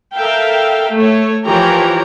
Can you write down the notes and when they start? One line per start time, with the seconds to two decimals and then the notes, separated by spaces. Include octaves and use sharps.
0.14 A4 A#4 E5 F5 G5
0.94 A3 C#5
1.46 E3 F3 G4 A#4 C#5 A#5